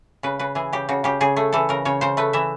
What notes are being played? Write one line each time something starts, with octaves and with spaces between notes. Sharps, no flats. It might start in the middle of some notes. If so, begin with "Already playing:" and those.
C#3 B4
C#3 B4
E3 G#4
C#3 G4
C#3 F#4
C#3 G4
C#3 G#4
A3 G#4
E3 A4
C#3 A#4
C#3 C#5
C#3 C5
A3 B4
E3 E5